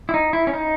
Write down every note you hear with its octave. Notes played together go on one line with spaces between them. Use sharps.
E4
D#4
E4
C#4
D#4